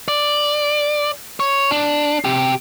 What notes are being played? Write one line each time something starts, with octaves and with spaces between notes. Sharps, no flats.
D5
C#5
D4
C3 G4